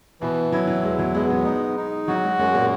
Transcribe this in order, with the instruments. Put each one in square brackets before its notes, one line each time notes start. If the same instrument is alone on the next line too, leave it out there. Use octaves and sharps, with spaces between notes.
[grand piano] B2 B3 [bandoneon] E3
[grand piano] F#3 [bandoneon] E4
[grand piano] F#3
[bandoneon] E2 [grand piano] G#3
[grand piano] F#3
[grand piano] G#3 [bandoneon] B3
[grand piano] F#3
[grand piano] G#3 [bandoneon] D#4
[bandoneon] D#4
[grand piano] F#3 [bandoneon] F#4
[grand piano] G#3
[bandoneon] F#2 [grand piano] G#3
[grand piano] A#2 A#3